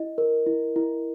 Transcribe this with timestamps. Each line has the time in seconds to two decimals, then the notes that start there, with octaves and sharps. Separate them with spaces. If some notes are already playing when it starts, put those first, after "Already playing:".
Already playing: E4 D#5
0.18 A#4
0.47 E4
0.76 E4